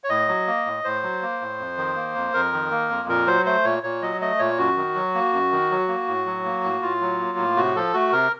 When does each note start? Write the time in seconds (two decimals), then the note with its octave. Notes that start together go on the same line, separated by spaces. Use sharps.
0.04 C#5
0.09 A2 D#5
0.28 F#3
0.47 A#3
0.66 A2
0.84 A2 C5
1.03 F#3
1.22 A#3
1.41 A2
1.59 F2
1.77 D#3
1.96 A#3
2.15 F2
2.33 F2 A#4
2.53 D#3
2.71 A#3
2.89 F2
3.08 A#2 A#4
3.27 F#3 C5
3.46 A3 C5
3.64 A#2 C#5
3.83 A#2 C#5
4.02 F#3 D#5
4.21 A3 D#5
4.39 A#2 C#5
4.58 F#2 F#4
4.77 D#3
4.95 F#3
5.15 A#3
5.33 F#2
5.52 D#3
5.71 F#3
5.88 A#3
6.08 A2
6.26 F#3
6.45 A#3
6.64 A2
6.82 A2 F4
7.01 F#3
7.19 A#3
7.38 A2
7.56 C3 F#4
7.75 F3 A4
7.94 A3 F#4
8.12 C3 A#4